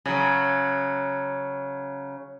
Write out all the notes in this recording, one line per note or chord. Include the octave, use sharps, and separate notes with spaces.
C#3 F#3